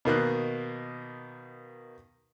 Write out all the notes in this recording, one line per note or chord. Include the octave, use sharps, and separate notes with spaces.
B2 D#3 A#3 F#6